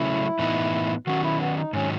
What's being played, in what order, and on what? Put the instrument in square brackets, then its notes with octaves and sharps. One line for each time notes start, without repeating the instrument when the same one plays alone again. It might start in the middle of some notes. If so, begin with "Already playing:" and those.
Already playing: [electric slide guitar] C#3 F#3 A3 C#4 [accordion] E4
[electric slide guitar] A2 E3 B3 D#4
[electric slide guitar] D#3 F#3 C#4 [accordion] F#4
[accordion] E4
B3
D#4
[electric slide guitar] G#2 D#3 F#3 [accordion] C#4